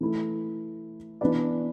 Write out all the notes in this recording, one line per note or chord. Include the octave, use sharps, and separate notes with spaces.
E3 A3 E4
E3 B3 D4 B4 D5